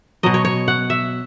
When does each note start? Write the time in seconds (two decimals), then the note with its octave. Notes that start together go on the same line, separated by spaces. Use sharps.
0.23 B2 F#3 D#5
0.34 C#5
0.45 C#5
0.68 F#5
0.90 E5